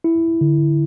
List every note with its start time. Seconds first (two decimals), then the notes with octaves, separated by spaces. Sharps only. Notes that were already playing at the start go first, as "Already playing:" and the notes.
0.04 E4
0.41 D3